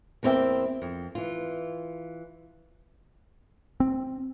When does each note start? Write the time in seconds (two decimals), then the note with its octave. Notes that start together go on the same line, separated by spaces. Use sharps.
0.23 E2 A#3 C4 C#5 E5 G5
0.82 F2
1.15 E3 F4
3.80 C4